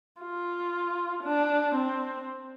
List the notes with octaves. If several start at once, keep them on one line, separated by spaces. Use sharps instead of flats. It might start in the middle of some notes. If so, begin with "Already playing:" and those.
F4
D4
C4